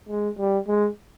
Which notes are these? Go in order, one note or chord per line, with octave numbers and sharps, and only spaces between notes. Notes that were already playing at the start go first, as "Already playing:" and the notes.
G#3
G3
G#3